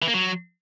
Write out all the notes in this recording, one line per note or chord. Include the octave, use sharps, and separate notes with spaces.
E3
A#3
F#3